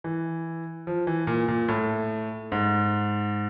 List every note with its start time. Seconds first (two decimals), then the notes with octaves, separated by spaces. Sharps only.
0.04 E3
0.87 F3
1.07 E3
1.27 A#2
1.48 A#2
1.68 A2
2.52 G#2